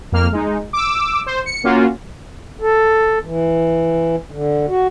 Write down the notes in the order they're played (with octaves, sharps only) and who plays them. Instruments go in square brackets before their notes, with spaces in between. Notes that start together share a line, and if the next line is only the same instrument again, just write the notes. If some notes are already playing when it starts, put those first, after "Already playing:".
[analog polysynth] F2 A#3 F6
G#3 D#4
D6 E6
C5
C#7
A#3 C#4 F4 F#4
[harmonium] A4
E3
D3
F#4